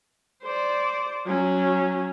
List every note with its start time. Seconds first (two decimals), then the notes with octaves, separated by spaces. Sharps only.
0.43 C5 D5
1.26 F#3 C#4